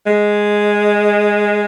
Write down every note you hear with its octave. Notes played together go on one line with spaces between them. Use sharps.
G#3